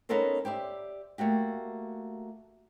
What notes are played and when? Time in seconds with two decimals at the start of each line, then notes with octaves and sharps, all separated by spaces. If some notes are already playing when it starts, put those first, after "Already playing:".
0.09 B3 C#4 D#4 A4 A#4 C5
0.45 G4 C5 D5 E5
1.18 A3 A#3 F#4 G4